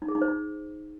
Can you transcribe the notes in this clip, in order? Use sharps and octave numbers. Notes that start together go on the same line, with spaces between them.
D#4
G#4
D#4
C5
D#4